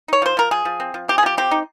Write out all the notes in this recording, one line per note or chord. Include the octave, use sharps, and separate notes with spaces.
D#4 C#5
F3 C5
F3 A#4
F3 G#4
F3
C4
F3
C4 G4
G#4
F3 G4
C4 G4
D#4